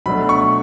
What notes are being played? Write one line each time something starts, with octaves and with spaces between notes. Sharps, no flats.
B2 F#3 A3 D4 B5
C#6